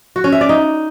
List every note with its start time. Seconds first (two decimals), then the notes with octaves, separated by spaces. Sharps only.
0.16 F#4
0.24 C#4
0.32 E5
0.41 D5
0.49 D#4